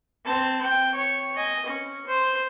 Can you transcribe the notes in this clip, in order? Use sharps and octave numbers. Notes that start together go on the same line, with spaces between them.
C4 A5
G5
C#5
D#5 G#5
C#4
C5